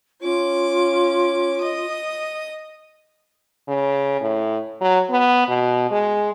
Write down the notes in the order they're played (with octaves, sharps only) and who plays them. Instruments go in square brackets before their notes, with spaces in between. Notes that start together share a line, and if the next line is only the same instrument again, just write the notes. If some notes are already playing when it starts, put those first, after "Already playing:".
[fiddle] C#4 D6 [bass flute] F4
[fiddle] D#5 D#6
[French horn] C#3
A2
F#3
B3
B2
G#3